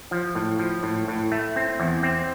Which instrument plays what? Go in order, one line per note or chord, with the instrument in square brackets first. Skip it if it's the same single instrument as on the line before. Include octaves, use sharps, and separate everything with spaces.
[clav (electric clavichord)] F3
A2
F3
A2
A2
A3
C4
E2
C4